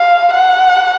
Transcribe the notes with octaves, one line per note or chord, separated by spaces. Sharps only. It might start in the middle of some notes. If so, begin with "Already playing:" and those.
Already playing: F5
F#5